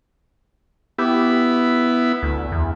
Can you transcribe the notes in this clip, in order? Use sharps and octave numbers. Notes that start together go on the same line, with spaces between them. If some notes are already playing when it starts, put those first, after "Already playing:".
B3 E4 G4
D2
E2